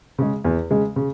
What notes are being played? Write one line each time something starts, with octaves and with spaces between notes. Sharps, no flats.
C#3 G#3
E2
C#3 G#3
C#3